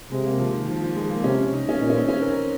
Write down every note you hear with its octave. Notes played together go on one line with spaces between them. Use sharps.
C3 G#3
A#3
F3
D#3
F3
F3
G#3
A#3
C3 C#4
D#4
C#4
A#2 D#4
C#4
C4
C#4
A#4